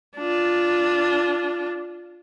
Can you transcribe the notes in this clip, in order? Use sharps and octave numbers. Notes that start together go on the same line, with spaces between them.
D4 F4